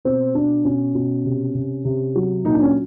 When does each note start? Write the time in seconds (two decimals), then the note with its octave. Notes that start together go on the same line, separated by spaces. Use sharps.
0.05 B2 C4
0.34 B2 D4
0.65 B2 C#4
0.95 B2
1.25 C3
1.55 C3
1.85 C3
2.15 F#3
2.44 A#2 D#4
2.54 D4
2.62 C#4